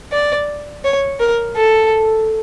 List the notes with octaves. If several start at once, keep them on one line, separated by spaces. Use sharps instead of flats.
D5
C#5
A#4
A4